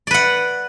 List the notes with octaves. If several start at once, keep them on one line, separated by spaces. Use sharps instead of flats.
B4 D5 F#5